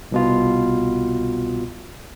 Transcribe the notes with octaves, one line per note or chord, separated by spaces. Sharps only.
C2 B2 F4